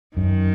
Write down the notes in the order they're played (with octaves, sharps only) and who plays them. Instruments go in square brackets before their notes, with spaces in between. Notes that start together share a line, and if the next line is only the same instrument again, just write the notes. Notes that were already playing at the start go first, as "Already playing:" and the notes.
[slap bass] F#2 [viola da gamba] D#3